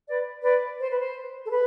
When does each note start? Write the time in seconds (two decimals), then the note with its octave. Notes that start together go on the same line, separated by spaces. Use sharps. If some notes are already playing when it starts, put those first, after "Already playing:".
0.07 B4 D5
0.43 B4 D5
0.78 C5
0.88 B4
0.99 C5
1.44 A4
1.49 B4